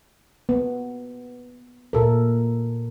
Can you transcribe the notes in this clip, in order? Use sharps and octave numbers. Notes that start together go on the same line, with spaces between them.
B3
A#2 A4 A#4